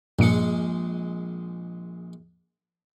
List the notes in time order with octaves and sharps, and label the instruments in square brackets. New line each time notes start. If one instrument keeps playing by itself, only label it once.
[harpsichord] A#1 G#3 [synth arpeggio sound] G2 A#2 C#7